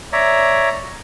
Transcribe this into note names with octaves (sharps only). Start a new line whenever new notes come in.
C#5 D5 E5 A#5